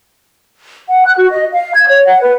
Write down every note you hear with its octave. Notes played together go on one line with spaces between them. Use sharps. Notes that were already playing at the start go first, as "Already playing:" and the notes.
F#5
F#6
F#4
D#5
F5
G#6
C#5
F#5
B4